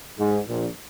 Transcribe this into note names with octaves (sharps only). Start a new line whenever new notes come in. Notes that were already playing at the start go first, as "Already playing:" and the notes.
G#2
A#1 A#2